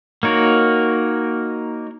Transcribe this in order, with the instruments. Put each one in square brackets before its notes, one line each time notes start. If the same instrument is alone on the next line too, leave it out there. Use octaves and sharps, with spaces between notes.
[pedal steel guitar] A#3 D#4 F#4 A#4 C#5